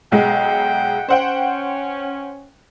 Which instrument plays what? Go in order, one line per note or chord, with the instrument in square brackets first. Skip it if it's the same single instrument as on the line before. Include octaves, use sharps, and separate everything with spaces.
[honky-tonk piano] B1 G#3 [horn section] F#5 G5
[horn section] C#4 [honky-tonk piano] C5 F#5 G5